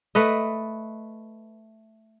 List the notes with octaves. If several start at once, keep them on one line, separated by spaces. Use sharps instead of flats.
A3 B4 D#5